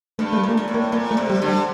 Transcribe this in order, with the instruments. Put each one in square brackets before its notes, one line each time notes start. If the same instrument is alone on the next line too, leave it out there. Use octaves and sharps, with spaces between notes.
[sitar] G2 [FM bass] A3
[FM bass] A3
G3
[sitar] A#2
[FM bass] A#3
[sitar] A#2 [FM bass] A3
[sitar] A2
[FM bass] A#3
[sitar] A#2 [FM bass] A#3
[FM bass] A3
[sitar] C3
[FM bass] G3
[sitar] D3
[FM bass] G3